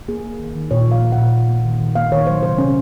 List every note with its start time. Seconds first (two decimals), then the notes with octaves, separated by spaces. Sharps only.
0.08 A#3 G#4
0.25 A#3
0.39 D#3
0.55 D#3
0.71 A#2 C#5
0.87 F3 F5
1.02 A#3
1.12 F#5
1.18 A#2
1.34 A#3
1.50 A#3
1.65 D#3
1.80 D#3
1.95 A#3 F5
2.12 D#3 C#5
2.27 F#3 C5
2.42 C3 C5
2.58 C3 C#4